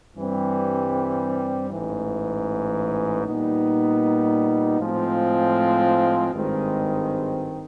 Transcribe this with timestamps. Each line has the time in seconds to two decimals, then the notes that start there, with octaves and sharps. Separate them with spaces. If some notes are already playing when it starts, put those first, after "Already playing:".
0.16 G2 E3 G3 C4
1.70 A1 G#2 E3
3.25 A#2 G3 B3 D#4
4.79 A2 F3 G#3 C4 F4
6.33 G#1 G2 D#3 G#3 C4